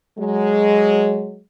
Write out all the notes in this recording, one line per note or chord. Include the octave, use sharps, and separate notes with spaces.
F#3 G#3